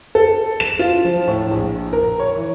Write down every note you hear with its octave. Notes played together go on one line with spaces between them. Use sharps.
A4
E7
F4
F3
A2
A#1
A#4
C#5
E3